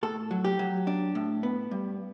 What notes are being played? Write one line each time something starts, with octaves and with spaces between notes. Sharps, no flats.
A2 A4
F#3
G4
F#3
D4
A2
B3
G2